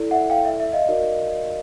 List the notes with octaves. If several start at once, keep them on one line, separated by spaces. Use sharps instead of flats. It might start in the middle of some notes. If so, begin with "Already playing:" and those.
Already playing: E4 A4 D5
E5 F#5
F5 G5
E5
E5
D#5 F5
D#4 F#4 A#4 D5